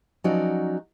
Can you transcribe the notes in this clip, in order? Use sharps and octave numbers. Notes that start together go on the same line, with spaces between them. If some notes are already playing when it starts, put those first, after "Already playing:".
F3 F#3 C#4 D#4 F#4 D5